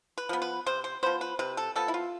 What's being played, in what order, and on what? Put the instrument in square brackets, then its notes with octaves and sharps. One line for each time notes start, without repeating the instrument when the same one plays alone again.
[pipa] B4
F3 B3
B4
C3 C5
C5
F3 B3 C5
B4
C3 B4
A4
F3 B3 A4
E4
F4